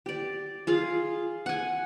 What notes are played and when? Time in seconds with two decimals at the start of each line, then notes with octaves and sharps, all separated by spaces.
0.06 G4 D5
0.67 F4 G#4 F5
1.46 F#5 G#5